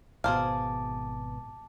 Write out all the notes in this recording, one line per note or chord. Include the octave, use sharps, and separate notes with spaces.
G#1 B2 G#4 C5 F5 A5 D6